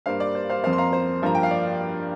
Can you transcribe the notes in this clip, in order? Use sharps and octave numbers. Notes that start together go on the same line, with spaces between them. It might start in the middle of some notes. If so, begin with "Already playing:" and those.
G2 G3 A#3 C5 F5
D5
C5
C5 F5
F2 F3 A#3 C5 F5
C6
F5 A#5
C5
G2 F3 A#3 A#5
G5
F5
D5